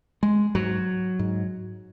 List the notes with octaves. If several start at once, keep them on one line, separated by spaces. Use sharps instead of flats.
G#3
G#2 F#3
G#2